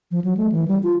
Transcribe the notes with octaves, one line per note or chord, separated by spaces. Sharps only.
F3
F#3
A3
E3
G3
F4